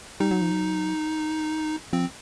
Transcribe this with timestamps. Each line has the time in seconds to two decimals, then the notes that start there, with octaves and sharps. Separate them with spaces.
0.20 G3 D#4
0.31 F#3
0.42 F3
0.51 F#3
1.93 F3 C4